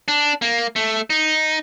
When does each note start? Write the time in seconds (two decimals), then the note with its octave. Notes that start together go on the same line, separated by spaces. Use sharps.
0.08 D4
0.42 A#3
0.76 A3
1.10 D#4